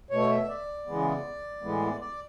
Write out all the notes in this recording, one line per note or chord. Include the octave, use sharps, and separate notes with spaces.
B2 A3 C#5
E5
D5
C#3 E3 G#3 B3
A2 E3 G#3 B3
D5